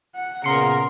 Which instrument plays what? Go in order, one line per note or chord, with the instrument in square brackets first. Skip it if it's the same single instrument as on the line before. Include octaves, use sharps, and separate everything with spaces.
[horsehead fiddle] F#5
[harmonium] A#2 B3 [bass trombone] C#3 [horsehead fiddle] A#4 [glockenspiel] C6 C7 C#7